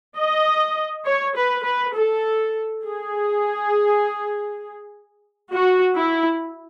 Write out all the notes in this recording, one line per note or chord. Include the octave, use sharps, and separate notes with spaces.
D#5
C#5
B4
B4
A4
G#4
F#4
E4